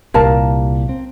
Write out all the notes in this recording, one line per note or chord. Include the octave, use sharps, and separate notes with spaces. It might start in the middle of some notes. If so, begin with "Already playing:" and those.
C2 A#2 G3 A#4 F5 A5
C4